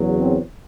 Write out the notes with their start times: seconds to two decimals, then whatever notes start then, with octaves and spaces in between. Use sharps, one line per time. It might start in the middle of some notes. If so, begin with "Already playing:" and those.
Already playing: E2 C#3 F#3
0.17 C4